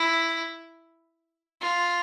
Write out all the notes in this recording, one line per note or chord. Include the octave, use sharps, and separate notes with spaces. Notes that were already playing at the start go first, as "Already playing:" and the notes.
Already playing: E4
F4